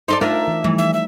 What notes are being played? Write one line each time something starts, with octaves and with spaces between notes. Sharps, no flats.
D#4 A4 C5 D5 C6
A3 D4 D#4 F4 A#4 E5
E3
E3 F3 G3 A3
D#4 E5
E5